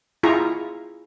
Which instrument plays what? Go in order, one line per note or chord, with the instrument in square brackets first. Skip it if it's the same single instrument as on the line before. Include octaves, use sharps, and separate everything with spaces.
[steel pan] E4 F4 G#4 A#5 C#6